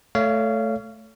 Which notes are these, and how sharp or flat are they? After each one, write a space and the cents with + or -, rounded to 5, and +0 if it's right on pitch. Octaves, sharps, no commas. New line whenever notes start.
A3 +0 C#5 +25 F5 -20